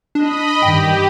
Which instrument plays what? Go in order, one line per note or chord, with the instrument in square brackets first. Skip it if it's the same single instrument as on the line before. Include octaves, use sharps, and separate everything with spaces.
[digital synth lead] D4 [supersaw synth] D#5 B5
[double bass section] G2 D#3 [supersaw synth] G4 [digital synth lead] G5